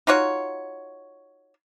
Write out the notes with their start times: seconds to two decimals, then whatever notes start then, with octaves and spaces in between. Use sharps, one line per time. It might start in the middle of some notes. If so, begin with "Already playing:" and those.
0.07 D#4 F4 F#4 C#5